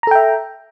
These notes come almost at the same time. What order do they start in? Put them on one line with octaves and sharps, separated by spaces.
A#5 A4 G5 E5